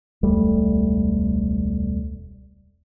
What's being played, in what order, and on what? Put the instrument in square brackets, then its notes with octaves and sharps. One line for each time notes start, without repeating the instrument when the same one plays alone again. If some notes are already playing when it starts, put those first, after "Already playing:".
[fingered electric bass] E1 C#2 G3 A3